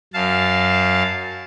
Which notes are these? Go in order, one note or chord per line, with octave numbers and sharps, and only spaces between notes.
F#2 F5 A5